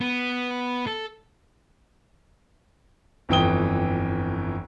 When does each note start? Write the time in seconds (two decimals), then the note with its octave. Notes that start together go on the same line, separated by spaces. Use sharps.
0.01 B3
0.87 A4
3.29 G1 F2 E3 G5 D#6 G7